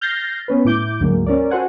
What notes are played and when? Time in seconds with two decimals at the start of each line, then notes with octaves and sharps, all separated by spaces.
0.01 F6 G6 A6 A#6 C7
0.48 B3 C#4 B4
0.65 A2 E4 D6 G6
1.00 D2 G#2 F#3 G#3 A#3
1.26 C#4 A#4 D5
1.50 F#4 A4 C5 F#5 G#5